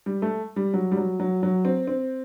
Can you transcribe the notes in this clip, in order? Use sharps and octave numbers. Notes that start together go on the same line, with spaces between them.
G3
A3
G3
F#3
G3
F#3
F#3
F#3
C4
C4